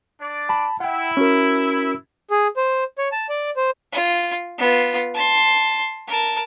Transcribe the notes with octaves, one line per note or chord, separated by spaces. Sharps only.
D4 D5
A5 B5
E4 F#5 G5
C#4 F#4 A#4
G#4
C5
C#5
A5
D5
C5
F4
B3 F4
A5 C6
A#4 A5